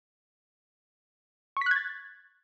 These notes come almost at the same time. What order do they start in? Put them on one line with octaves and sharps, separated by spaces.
C#6 B6 F#6 G#6 A6